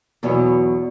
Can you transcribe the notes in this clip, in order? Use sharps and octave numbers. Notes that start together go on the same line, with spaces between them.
E2 B2 F#3 C#5